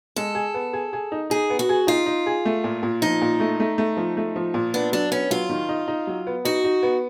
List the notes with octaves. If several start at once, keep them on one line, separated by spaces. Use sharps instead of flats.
G#3 A4
G#4
B3
G#4
G#4
D#4
D#4 G#4
B3
F#4
G#4
D#4 F4
D#4
G#4
A3
A#2
A#2
F3 D#4
A#2
A3
A3
A3
F3
A3
F3
A#2
B3 D4
F#3 D4
B3 C#4
F#3 F4
D#3
D#4
D#4
F#3
B3
D#4 F#4
D#4
B3